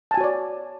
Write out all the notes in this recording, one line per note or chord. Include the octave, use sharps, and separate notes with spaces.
F#4 C#5 D5 G#5 A5